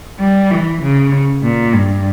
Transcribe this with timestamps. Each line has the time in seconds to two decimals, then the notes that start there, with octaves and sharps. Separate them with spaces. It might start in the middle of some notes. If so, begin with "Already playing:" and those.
0.20 G3
0.51 E3
0.82 C#3
1.43 A#2
1.73 G2